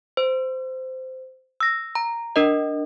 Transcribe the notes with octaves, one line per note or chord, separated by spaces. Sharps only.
C5
E6 A#6
A#5
D4 A#4 D#5